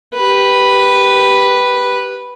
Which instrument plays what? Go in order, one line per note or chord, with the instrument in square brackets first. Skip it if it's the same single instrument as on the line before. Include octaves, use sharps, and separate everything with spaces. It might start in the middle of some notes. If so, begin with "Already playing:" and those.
[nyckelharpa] G4 B4